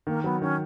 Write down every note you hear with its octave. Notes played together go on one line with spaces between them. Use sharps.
D#3 A#3
F#3 B3
D#3 C#4